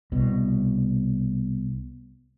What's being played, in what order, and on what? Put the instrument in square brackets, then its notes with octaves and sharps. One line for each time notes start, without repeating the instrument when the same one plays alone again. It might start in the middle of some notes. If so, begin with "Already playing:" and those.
[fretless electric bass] C2 B2